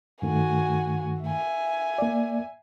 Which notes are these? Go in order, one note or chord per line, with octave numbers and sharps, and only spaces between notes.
G2 D#3 A3 F#4 G#5
E5 G#5
A#3 D5